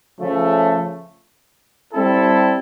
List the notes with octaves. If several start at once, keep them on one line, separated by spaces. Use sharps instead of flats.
C#3 F3 A3 C#4
G3 C4 E4 A4